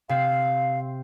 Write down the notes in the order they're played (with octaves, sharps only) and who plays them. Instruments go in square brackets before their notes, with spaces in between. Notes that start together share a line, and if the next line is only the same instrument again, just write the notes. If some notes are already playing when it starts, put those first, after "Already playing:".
[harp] C3 C4 C7 [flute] F5